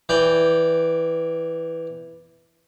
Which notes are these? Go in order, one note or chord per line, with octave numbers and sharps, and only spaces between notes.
E3 D5 G5